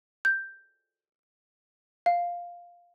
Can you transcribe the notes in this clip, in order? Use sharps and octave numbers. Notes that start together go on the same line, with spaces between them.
G6
F5